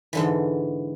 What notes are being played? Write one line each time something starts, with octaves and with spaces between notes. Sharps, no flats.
G#2 D3 E3